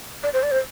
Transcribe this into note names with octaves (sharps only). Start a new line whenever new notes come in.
D5
C5
D5
C5